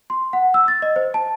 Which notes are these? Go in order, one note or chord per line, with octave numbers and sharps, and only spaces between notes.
C6
F#5
E6
A6
D#5
C5
A5